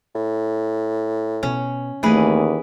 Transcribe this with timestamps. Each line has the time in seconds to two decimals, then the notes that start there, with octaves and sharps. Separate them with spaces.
0.15 A2
1.43 B2 C#4
2.03 D#2 E3 A3 C4 G#4 B4